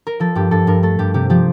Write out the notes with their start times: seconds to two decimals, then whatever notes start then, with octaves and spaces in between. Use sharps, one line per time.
0.07 A#4
0.20 F3 A4
0.35 G2 G4
0.51 G2 A4
0.67 G2 A#4
0.83 A3 A4
0.99 G2 G4
1.14 C3 G4
1.30 F3 G4